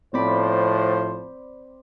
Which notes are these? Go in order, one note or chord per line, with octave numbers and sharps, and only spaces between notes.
A2 F3 C4 C5 D5 B5